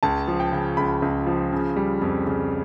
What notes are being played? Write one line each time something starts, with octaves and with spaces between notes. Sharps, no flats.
C#2 A5
F3
G5
C#3
C#2 B5
C#2
F3
C#3
G3
F2
C#3